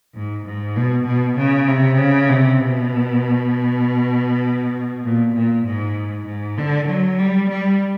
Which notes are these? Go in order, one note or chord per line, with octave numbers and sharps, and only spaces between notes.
G#2
G#2
B2
B2
C#3
C3
C#3
C3
B2
A#2
A#2
G#2
G#2
D3
F#3
G3
G3